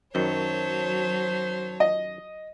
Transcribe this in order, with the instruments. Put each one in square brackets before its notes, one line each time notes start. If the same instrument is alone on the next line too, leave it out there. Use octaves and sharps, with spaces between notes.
[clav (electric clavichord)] F#2 D#3 [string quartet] F#3 C#5 A5 [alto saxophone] C5
[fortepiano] D#5